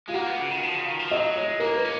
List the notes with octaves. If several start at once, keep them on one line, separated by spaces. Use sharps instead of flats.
G#3 F4
A#3 F#4
B3
C#3
D#3
F3
C#3
D#3
F3
F#3 D#5
G#3 C#5
A#3 A#4
B4
C#4